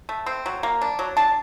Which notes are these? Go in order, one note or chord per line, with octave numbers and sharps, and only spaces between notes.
A3
C4
F#3
A#3
D4
F#3
D4 A5